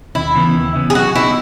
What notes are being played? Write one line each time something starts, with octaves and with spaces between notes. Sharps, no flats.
D#2 E4
C#3 E3 B3
D#2
C#3 E3 B3
G#4
F#3 F#4
B3 D#4 E4 G#4